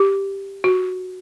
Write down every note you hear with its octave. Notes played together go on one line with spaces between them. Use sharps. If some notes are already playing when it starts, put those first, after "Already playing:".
Already playing: G4
F#4